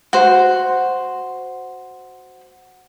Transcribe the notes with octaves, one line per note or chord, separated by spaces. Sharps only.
F#4 C5